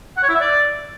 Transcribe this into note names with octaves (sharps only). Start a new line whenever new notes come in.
F#5
C#5
E4
E5
D5